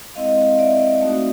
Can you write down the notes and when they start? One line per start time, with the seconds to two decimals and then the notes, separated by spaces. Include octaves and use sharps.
0.15 G#3 C4 E4 D#5 F5
0.59 D5 E5
1.01 A3 C4 D#4 F#4